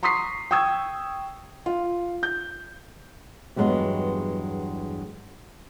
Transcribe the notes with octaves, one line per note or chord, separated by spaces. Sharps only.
A#5 C6 C#6 D#6 B6 C7
G5 C#6 D#6 E6 G#6
F4
G6
E2 G2 F#3 G#3 B3